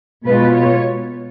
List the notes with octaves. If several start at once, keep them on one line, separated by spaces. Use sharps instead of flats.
B2 G#3 B3 F4 B4
C#5